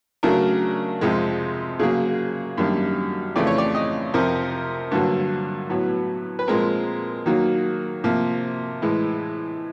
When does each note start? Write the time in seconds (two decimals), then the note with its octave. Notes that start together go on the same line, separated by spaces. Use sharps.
0.23 C#3 F#3 A3 D4 A#4
1.01 F2 C3 F3 G#3
1.79 C#3 F#3 A#3 G#4
2.57 F#2 D#3 G3 A#3 D4
3.36 F2 C#3 E3 A3 D5
3.47 C#5
3.58 D5
3.75 D#5
4.14 F2 C3 F3 A#4
4.91 G2 D3 F#3 A#3
5.70 A2 F#3 B3
6.39 B4
6.48 A#2 F3 G#3 C4 A#4
7.26 D#3 F#3 A#3
8.04 C3 F3 A#3
8.82 A2 E3 G#3